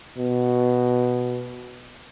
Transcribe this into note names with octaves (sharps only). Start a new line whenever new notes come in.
B2